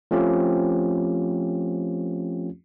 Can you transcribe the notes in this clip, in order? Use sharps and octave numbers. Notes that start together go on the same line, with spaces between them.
F3 A3 C4 C#4 F4 G4